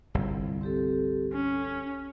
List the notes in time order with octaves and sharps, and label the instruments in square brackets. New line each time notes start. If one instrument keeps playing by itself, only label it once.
[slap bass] G1 C2 [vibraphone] E4
[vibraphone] C4 G4 A4
[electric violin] C#4 [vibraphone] G#5